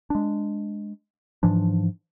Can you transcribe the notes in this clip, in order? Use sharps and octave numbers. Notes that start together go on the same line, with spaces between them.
G#3 D4
G#2 E3 F3 D4